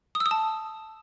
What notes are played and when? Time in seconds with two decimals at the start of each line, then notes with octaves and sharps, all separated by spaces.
0.15 D#6
0.20 E6
0.26 D#6
0.31 A5